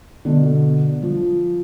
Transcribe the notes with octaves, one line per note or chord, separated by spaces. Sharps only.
B2 D3
F3